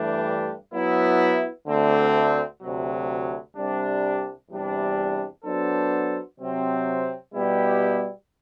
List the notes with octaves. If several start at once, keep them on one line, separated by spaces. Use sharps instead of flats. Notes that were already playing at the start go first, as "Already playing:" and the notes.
Already playing: G2 E3 A3 D4 G4
F#3 B3 E4
D2 D3 A3 C4
D2 C3 F#3
C2 C3 G3 D4
E2 C3 G3 D4
F#3 B3 D4 A4 C5
C3 F#3 C4
B2 G3 B3 E4 G4